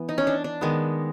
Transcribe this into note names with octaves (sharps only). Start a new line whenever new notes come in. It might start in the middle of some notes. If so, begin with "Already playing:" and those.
Already playing: E3 B3
D#4
C#4
D4
D4
D#3 G#3 B3